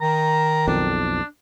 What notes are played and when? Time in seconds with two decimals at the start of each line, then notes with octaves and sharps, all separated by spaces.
0.01 D#3 A#5
0.68 B1 F2 D4